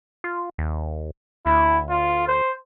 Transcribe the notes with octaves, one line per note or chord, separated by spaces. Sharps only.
F4
D#2
D2 E4
F4
C5